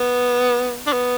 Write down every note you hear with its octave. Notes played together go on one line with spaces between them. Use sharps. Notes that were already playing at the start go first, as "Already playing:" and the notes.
Already playing: B3
D4
B3